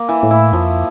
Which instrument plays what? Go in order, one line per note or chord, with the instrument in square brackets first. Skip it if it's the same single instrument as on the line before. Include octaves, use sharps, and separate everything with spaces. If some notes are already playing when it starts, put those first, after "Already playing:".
Already playing: [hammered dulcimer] A#3
E3
[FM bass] A2
[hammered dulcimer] E4
[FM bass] F2 [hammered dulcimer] F3